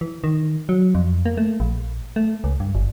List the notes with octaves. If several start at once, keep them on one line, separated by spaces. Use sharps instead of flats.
E3
D#3
F#3
F2
A#3
A3
A#1
A3
C#2
G2
G1